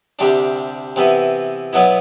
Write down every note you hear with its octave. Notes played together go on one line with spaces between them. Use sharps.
D2 C3 G3 D4
C3 E3 B3 E4
B2 F#3 B3 E4